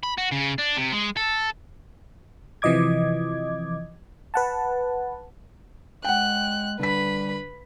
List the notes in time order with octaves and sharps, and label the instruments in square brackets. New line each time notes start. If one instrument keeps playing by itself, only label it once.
[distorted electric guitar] B5
F#4
C#3
D4
C3
G#3
A4
[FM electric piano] C3 E3 F3 D#5 D6 G#6
B4 F#5 A5
[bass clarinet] G#3 [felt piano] F#5 G5 [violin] F#6
[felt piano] D3 B6 [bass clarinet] G3 [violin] B4 B5